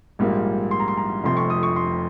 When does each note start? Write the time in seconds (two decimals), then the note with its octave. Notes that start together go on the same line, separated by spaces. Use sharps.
0.19 A#1 G#2 G3 A#3 F4
0.71 C6
0.80 A#5
0.88 C6
0.97 A#5
1.24 F1 F2 C3 F3 C6
1.37 C#6
1.50 D#6
1.63 C#6
1.76 C6